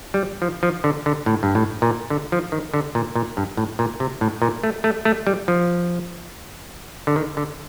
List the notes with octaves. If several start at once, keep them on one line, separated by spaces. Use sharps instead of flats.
G3
F3
F3
D3
D3
A2
G2
A2
A#2
D3
F3
D#3
D3
A#2
A#2
G2
A2
A#2
C3
A2
A#2
A3
A3
A3
G3
F3
D3
D#3
D3